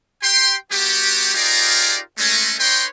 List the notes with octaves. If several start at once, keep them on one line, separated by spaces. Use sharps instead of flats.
G4 G5 C6
G3 B3 F#4 G4
D#4 F4 G4 G#4 A#4 D5
G#3 A3 C#4
D#4 B4 C#5 G5 C6